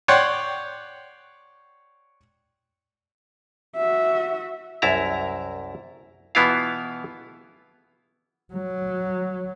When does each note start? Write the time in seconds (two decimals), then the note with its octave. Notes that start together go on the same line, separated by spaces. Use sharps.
0.08 C#5 D5 F#5 G5 C6
3.76 F#4 E5
4.82 C2 F#2 E4 A5 A#5
6.35 B2 E3 B3 E4 F4 F5
8.54 F#3